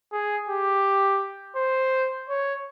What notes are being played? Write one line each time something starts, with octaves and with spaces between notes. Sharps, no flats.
G#4
G4
C5
C#5